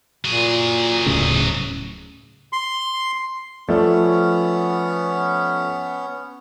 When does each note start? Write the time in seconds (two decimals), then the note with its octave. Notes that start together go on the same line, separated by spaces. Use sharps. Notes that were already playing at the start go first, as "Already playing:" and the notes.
0.25 A#2 F#3 G#4
1.07 D1 A2 C#3
2.53 C6
3.69 F3 A3 B3 C#4 D5